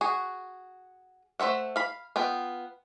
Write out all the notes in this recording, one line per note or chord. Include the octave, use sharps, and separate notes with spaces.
F#4 G#4
A3 C5 E5 F#5
F5 B5
B3 F4 G5